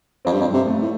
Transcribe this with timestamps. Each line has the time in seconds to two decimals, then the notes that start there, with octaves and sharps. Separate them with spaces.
0.25 F2 C4
0.32 G2
0.41 F2
0.47 G2
0.53 C3
0.67 A3
0.82 A2